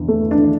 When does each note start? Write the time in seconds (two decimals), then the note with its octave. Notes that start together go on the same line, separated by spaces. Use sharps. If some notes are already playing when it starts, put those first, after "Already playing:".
Already playing: E2 D3
0.08 A3
0.31 D4